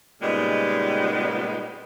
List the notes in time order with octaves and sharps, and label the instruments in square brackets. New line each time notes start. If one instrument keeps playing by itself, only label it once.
[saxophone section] A#2 C#3 G3 G#3 B3 D#4